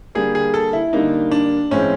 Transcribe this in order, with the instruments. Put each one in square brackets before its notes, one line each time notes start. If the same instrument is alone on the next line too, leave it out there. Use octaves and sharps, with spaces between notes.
[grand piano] D3 G3 A#3 G#4
G#4
A4
E4
D3 G3 A#3 D#4
D4
A2 F3 G#3 C4 C#4